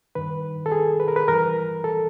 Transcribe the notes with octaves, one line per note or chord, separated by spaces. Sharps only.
G2 D#3 B4
A4
G#4
B4
A#4
B4
G2 E3 A#4
A4